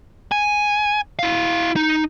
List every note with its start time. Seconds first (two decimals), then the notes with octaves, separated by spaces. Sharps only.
0.32 G#5
1.19 E4 F5
1.76 D#4